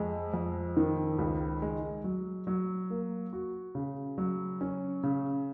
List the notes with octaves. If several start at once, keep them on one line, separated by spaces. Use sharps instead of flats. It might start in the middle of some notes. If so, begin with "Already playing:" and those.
Already playing: F2 G#3
F2
D#3
C#2
G#3
F#3
F#3
A#3
F#4
C#3
F#3
C#4
C#3